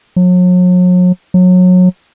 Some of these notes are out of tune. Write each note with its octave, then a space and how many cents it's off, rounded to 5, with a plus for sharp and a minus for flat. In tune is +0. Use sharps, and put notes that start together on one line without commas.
F#3 -40
F#3 -25